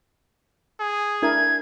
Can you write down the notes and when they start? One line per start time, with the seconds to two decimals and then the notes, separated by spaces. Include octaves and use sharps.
0.80 G#4
1.22 D4 E4 A#4 G#6